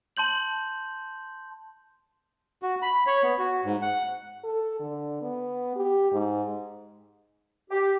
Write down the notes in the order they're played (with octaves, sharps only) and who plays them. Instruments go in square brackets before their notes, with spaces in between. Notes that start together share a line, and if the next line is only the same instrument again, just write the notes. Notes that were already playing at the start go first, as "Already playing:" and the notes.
[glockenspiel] A5 C6 G6 F#7
[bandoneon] F#4
B5
C#5
B3
F#4
G#2
F#5
[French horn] A4
D3
B3
G4
G#2
[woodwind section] G4